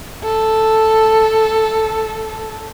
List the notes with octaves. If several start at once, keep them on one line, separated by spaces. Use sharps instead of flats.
A4